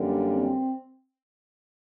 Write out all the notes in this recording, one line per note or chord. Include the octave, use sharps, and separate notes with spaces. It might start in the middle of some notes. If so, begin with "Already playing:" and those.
Already playing: F#2 D3 G3 A#3
C4